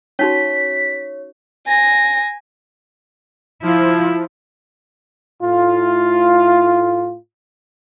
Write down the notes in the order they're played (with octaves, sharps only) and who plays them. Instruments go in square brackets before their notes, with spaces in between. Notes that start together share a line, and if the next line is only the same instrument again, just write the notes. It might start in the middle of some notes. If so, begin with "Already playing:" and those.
[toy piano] C#4 D#4 F#4 [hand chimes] C#5 [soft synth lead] B6
[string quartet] G#5 A#6
[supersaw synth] F3 [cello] E4
[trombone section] A2 F4